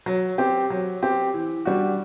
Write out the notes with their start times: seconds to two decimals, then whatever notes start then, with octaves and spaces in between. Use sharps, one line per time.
0.06 F#3
0.38 C4 G4
0.70 F#3
1.02 C4 G4
1.34 E3
1.65 G3 D4 F#4